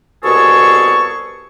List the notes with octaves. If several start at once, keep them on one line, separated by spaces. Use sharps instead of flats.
C2 B2 G#4 A4 C#6